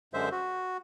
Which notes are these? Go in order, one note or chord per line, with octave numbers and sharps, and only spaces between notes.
F#2 D3 G#3 C5 E5
F#4